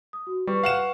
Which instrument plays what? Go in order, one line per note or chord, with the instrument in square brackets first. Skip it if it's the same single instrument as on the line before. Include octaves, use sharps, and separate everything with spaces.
[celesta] D#6
F#4
[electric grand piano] G3 [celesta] F4 B4 C#6
[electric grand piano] F5 F#5 E7